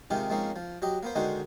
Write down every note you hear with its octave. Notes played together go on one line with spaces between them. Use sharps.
C3 D#3 G#3 D#4 F4 G4
F3 G#3 A#3 C4 C#4 D#4
F3
F#3 G4 D#5
A#3 B3 C5
D3 D#3 G#3 D#4 F#4 C5